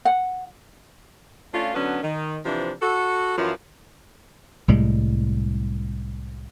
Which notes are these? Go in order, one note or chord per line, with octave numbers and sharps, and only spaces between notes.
F#5
A3 C#4 D4 F4
D3 F#3 B3 C#4 D4
D#3
C3 E3 F3 D4
F#4 A4
F#2 E3 F3
C2 A2 G3 G#3